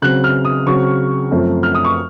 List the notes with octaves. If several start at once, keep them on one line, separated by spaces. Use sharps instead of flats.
C#3 F#3 C4 F#6
F6
D#6
C#3 F#3 C4 C#6
F#2 F3 A3 C4
F6
D#6
C#6